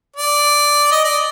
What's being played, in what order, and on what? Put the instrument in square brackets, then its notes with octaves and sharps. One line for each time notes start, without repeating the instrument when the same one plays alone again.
[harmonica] D5
D#5
D5